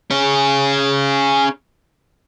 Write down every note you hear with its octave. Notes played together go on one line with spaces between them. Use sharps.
C#4 G#4